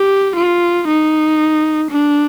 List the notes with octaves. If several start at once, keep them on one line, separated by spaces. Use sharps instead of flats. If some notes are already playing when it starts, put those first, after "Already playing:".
Already playing: G4
F4
D#4
D4